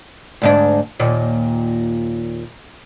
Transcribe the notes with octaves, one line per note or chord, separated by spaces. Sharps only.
D2 G#2 D4
D#2 A#2